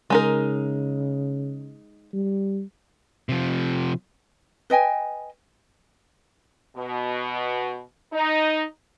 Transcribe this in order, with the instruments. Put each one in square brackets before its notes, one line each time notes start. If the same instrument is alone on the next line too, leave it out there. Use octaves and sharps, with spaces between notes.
[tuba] C#3 [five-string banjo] G#3 D#4 A#4
[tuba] G3
[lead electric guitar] C3 F3
[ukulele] B4 D#5 G5 G#5
[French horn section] B2
D#4